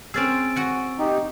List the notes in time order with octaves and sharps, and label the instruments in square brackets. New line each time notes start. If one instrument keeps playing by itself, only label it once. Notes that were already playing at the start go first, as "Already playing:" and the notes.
[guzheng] C4 C#4 G#4 [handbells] E6 A6 D7
[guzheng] F#4 F#5 G#5
[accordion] D#4 G4